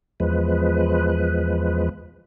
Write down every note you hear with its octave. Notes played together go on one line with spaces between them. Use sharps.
E2 F3 G#3 B4